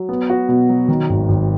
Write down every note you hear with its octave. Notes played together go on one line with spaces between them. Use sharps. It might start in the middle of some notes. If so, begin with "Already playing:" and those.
Already playing: F#3
B3
F#4
B2
F#3
D#3
G#1
G#1